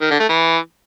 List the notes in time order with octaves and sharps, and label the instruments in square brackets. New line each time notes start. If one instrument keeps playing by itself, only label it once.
[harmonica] D#3
D3
A3
E3